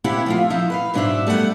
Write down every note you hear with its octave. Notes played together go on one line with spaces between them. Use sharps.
A#3 C4 D4 E4 G4 F#5
F3 A3 F4
F3 D#4 E4
B4 E5 F5
G#2 F#3 D4 A4 C5 E5
G3 A3 B3 F#5